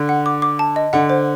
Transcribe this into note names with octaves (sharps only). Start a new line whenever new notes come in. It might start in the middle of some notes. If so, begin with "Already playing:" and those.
Already playing: D3
F#5
D6
D6
A5
D#5
D3 F#5
C5